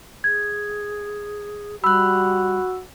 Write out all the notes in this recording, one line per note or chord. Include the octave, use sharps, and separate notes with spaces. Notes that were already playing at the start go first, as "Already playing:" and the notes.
G#4 G#6
G3 F#4 B5 E6 F#6